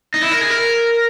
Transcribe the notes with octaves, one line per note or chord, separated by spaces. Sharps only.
D#4
E4
A#4
G#4
A#4